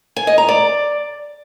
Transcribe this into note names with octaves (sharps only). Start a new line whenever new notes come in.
G#5
D#5
A#5
D5